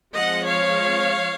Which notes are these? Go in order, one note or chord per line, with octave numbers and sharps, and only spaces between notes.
F3 G#3 C4 D#5 F#5
C#5 F5